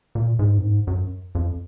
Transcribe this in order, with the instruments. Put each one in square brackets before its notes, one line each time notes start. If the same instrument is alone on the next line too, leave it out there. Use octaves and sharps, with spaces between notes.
[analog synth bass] A#2
G#2
F#2
G#2
F#2
F2